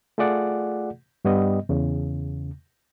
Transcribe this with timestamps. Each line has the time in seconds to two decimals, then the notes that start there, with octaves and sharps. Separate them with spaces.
0.18 A3 F4 G#4 D5 F#5
1.25 G2 G3 B3 D#5
1.69 E2 C#3